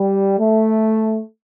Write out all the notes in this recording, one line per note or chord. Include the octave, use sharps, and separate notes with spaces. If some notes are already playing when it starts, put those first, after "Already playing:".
Already playing: G3
A3